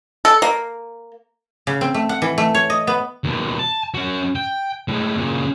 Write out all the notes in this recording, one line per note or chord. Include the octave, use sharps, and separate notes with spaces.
A4
A#3
C#3
C4
A3
F#5
E3
A3
C#5
D#5
B3
D#2 B2
A5
C#4 F#4
G5
A2 G#3
A#2 C#3